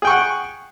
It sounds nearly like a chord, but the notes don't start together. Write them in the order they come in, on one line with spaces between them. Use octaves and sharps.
G#4 G5 C#6 F#5